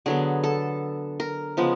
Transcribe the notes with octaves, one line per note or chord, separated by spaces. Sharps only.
D3 F#3 B3 G#4
A4
A#4
C#3 F3 G#3 B3